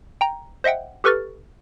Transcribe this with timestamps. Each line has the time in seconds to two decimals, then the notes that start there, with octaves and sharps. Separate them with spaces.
0.21 G5 A#5
0.64 C5 D#5 E5 F#5 G5
1.04 G4 A4 B4 C#6 F6 A6